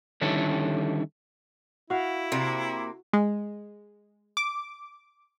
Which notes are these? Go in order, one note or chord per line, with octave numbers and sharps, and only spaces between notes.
D3 D#3 G3 C#4 E4 A4
E4 F#4 F5
C3 A#3
G#3
D6